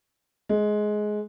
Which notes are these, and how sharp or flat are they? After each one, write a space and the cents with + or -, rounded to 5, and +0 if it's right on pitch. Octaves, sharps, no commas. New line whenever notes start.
G#3 +15